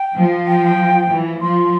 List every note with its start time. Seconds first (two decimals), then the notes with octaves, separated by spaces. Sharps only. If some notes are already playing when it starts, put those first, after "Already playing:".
Already playing: G5
0.17 F3
0.47 G5
1.10 E3
1.42 F3 C6